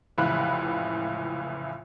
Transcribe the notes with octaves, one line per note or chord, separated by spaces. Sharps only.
F1 C#2 A2 E3 B5 F#6